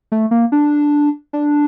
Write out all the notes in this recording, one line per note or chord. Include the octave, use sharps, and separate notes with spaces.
A3
A#3
D4
D4